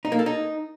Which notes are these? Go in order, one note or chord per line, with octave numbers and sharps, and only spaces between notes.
D#4
A#3
A4
D#4